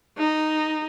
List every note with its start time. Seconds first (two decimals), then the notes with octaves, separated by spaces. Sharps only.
0.18 D#4